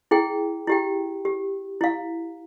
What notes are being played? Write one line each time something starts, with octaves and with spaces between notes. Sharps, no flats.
E4 G#4 G5
E4 G4 G5
G4
E4 F5